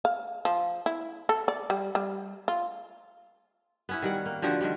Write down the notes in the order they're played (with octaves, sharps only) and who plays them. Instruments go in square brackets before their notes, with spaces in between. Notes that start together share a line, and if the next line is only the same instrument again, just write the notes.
[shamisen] F5
F3
E4
A4
D5
G3
G3
F4
[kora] B3 C#4 E4
D#3 G3 F#5
A#3
D3 F3 F#4 G4
D#3 F3 G3